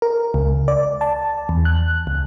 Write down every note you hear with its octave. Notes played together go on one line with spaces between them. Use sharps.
A#4
C#2
D5
A5
E2
F#6
C#2